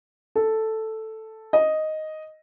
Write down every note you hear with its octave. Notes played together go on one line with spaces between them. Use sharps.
A4
D#5